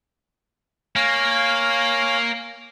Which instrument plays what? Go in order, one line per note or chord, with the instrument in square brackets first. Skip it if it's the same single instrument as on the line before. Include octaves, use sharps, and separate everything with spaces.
[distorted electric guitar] A#3 [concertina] C#5 F5 G#5